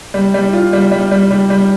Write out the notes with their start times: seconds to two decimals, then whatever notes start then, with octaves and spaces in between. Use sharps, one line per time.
0.14 G3
0.34 G3
0.53 F4
0.73 G3
0.92 G3
1.11 G3
1.31 G3
1.50 G3